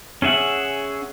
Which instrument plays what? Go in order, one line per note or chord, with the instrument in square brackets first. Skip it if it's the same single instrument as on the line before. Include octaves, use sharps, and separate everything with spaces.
[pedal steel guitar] C#4 G#4 E5 F#5